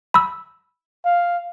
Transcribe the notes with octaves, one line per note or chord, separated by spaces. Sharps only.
B5 E6
F5